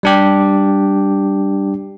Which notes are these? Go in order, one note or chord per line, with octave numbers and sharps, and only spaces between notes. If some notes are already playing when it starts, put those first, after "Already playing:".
G3 D4 G4